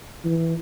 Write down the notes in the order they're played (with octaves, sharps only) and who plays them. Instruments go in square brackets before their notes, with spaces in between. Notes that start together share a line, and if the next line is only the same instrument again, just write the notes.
[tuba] E3